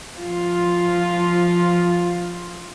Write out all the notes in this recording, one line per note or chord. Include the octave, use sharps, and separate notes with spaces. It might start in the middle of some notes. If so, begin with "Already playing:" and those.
F3 F4